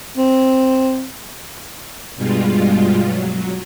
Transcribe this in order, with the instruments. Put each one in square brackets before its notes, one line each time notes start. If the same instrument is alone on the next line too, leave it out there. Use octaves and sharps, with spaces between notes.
[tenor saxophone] C4
[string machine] G2 B2 G3 G#3 F4
F#3